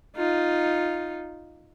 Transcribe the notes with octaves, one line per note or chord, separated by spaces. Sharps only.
D#4 F4